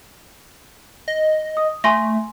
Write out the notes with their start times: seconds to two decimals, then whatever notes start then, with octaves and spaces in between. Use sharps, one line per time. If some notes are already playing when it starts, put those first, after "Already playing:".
1.08 D#5
1.57 D#6
1.84 A3 G#5 C6 A#6